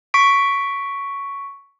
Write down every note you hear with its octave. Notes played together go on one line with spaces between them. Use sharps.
C#6 B6 D7